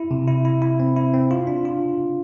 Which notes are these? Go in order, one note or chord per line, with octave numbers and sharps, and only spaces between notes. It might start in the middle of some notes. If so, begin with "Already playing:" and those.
Already playing: E4
C3
E4
E4
E4
C4
E4
C4
F4
D4
F4